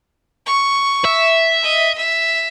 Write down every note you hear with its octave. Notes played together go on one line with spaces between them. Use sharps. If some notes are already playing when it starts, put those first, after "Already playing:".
C#6
E5
D#5
E5